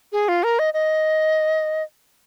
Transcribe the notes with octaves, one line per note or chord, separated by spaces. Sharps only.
G#4
F4
A#4
D#5
D#5